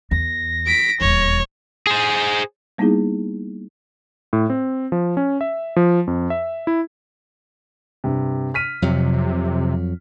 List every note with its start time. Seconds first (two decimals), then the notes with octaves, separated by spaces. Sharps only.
0.11 E2 A#6
0.66 B6 D7
1.01 D#1 E2 C#5
1.87 G#4 C5
2.78 G3 A#3 B3 D#4 E4 G#4
4.33 A2
4.50 C4
4.92 F3
5.17 C#4
5.41 E5
5.76 F3
6.07 F2
6.30 E5
6.67 E4
8.04 G2 C3
8.54 F6 B6 D#7
8.82 F2 C3 F#3